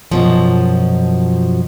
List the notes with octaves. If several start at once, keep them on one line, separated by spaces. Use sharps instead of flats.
F#2 B2 F3